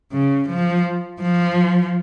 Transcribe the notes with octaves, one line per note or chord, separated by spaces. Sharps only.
C#3
F3
F3